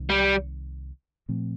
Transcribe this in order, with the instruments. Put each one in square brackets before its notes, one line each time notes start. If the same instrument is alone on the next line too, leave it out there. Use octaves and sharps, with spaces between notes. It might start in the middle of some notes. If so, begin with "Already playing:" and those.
Already playing: [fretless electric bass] C2 C3 D#3
[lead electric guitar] G3
[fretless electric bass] A#2 F3 A3 C4